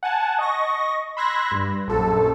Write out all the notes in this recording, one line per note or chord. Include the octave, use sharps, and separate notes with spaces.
F#5 G#5 A5
D#5 C#6 A#6
B5 C6 E6 F#6 G#6 A#6
G2
A#1 F#2 A4